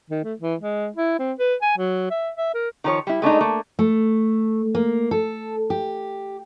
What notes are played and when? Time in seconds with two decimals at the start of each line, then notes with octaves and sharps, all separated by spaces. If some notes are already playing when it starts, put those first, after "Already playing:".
0.10 D#3
0.24 A3
0.40 E3
0.61 G#3
0.96 E4
1.19 C4
1.39 B4
1.62 G#5
1.78 F#3
2.10 E5
2.37 E5
2.54 A#4
2.84 D#3 F3 C#5
3.07 G3 E4
3.22 G#3 A3 D4 D#4
3.41 A3 A#3
3.79 A3
4.75 A#3
5.11 A4
5.70 G4